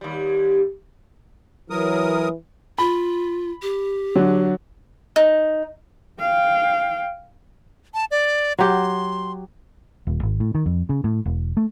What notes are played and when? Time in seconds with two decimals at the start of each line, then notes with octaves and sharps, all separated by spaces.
0.01 D#2 G3
1.70 E3 F#3 A#4 D#6
2.78 F4 B5
3.62 G4
4.16 D3 F#3
5.16 D#4
6.19 F5 G5
7.94 A5
8.11 D5
8.59 F#3 G4 C6
10.07 D#1
10.23 G#1
10.40 A2
10.55 D#3
10.66 F2
10.89 C#3
11.04 A2
11.26 E1
11.57 A3